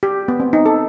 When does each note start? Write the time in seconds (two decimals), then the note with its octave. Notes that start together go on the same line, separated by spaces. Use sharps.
0.03 G4
0.28 B3
0.40 C4
0.53 D#4
0.66 A4